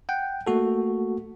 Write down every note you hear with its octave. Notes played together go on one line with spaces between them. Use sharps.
F#5 G5
A3 A#3 F#4 A4